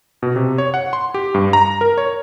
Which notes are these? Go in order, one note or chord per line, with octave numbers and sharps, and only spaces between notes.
B2
C3
C#5
F#5
C6
G4
G2
A#5
A#4
C#5